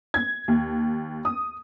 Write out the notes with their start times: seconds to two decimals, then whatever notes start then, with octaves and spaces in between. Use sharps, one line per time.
0.14 G#6
0.48 D#2
1.25 D#6